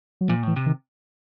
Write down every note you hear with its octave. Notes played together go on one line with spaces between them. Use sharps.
F#3
A#2 F3
A2 E3
C3
D#3